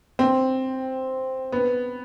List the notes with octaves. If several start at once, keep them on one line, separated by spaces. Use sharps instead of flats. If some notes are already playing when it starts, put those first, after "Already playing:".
C4
B3